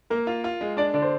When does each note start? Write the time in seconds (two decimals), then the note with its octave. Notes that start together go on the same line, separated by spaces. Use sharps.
0.10 A#3 A#4
0.27 F4
0.44 F4
0.61 G#3
0.77 D4 D5
0.94 D3 D5
1.02 C5